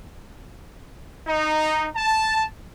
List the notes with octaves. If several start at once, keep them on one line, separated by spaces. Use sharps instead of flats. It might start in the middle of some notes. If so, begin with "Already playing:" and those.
D#4
A5